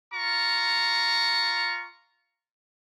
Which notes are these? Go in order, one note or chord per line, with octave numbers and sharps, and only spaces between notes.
F4 A#5 C#6